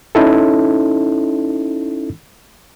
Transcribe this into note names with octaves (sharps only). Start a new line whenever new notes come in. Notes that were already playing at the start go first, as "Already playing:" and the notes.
C#4 D#4 E4 A4